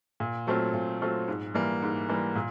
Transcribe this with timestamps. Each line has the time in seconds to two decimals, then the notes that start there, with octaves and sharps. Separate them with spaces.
0.20 A#2
0.47 F#3 A3 C4 F4
0.74 A#2
1.01 F#3 A3 C4 F4
1.28 G#2
1.54 E3 G3 A#3
1.82 G#2
2.09 E3 G3 A#3
2.36 A#2